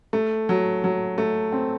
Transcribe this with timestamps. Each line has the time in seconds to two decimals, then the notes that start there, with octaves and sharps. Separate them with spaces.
0.13 A3
0.49 F#3
0.84 F#3
1.18 A3
1.52 C4